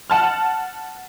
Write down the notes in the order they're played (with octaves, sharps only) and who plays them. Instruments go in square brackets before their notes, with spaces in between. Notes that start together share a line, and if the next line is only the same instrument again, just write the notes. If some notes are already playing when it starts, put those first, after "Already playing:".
[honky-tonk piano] F#5 A5 F6